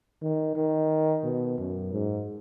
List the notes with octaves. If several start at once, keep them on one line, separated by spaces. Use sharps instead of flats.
D#3
D#3
B2
F#2
G#2